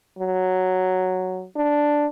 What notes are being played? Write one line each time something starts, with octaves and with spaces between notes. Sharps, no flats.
F#3
D4